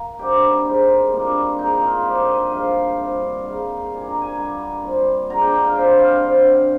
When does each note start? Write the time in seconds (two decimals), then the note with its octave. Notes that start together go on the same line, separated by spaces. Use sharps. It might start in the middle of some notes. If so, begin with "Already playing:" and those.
Already playing: A#3
0.19 D3 G3 C4 D#4 G4
0.65 D#3 G#3 C4 D#4
1.12 A#2 G3 A#3 D4
1.58 G#2 D#3 G#3 D#4
1.82 F4
2.05 G2 F3 A#3 G4
2.28 D#5
2.51 G2 F3 G#3 D#4 F5
2.97 C3 G3 D4
3.44 G#2 D#3 G#3 D#4 F5
3.90 A#2 G3 D4 G#5
4.06 A#5
4.22 G#5
4.37 D3 G3 A#3 D#4
4.83 A#2 G3 C4
5.30 D3 G#3 D4 A#5
5.41 G5
5.53 G5
5.64 F5
5.75 D3 G3 C4 G5
5.99 F5
6.22 D3 F3 C4